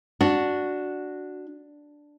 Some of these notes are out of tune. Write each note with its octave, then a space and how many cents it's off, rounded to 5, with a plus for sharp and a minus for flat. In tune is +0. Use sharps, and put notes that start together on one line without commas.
D4 +0 F#4 +0